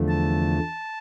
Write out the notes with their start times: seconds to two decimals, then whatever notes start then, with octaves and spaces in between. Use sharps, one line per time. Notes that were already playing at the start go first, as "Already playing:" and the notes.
Already playing: E2 D3 F3 A3
0.08 A5